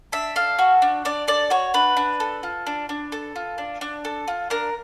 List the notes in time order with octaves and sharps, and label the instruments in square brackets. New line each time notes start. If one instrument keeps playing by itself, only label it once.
[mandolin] D4 E5
A4 F5
F#4
D4
D4 D5
A4 D5
F#4 C#5
D4 B4
D4
A4
F4
D4
D4
A4
F4
D4
D4
A4
F4
D4 A#4